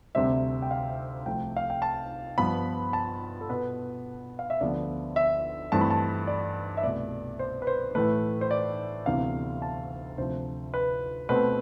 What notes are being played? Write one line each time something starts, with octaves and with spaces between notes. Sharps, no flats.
D2 C3 G3 C4 E5
G5
F5
C2 C3 F3 A3 G5
F5
G5
A5
G2 F3 B3 B5
A5
A4
B2 B3 B4
F5
E5
D2 D3 F3 B3 D5
E5
G2 E3 A3 C4 A5
B5
A5
D5
E5
C2 B2 A3 D5
C5
B4
C5
A2 E3 A3 B4
C5
D5
D2 C3 E3 B3 F5
A5
D2 C3 F3 C5
B4
B2 A3 C4 B4